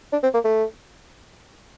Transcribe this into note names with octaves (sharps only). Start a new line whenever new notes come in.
D4
C4
A#3
A3